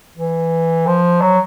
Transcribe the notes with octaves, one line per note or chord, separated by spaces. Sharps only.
E3
F3
F#3